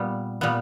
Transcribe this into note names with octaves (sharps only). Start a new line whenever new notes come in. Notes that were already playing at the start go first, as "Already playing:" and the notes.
Already playing: A#2 G3 B3
A#2 G3 B3